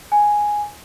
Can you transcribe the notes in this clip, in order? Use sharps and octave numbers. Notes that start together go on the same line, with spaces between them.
G#5